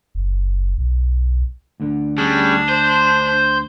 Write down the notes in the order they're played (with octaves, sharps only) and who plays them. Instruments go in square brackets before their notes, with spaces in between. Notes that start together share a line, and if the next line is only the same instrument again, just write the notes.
[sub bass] F#1
B1
[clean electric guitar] D2 D3
[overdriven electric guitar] G3 [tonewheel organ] C#4 G#4 [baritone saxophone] D4
[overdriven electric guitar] C5 [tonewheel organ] G6